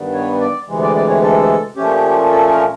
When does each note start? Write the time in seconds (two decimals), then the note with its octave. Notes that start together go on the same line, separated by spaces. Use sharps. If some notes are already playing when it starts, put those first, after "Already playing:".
Already playing: G2 D#3 G3 B3
0.13 C#5
0.40 D5
0.67 D2 C3 E3 G#3
0.82 D5
0.96 D5
1.09 C#5
1.23 A4
1.76 A#2 F3 A3 C#4 G4
2.31 A4
2.50 A#4